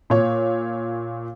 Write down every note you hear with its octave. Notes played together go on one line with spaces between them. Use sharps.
A#2 C#5